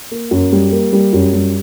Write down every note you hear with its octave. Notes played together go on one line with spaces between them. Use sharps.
A#3
F#2
G3
A#3
G3
F#2
G3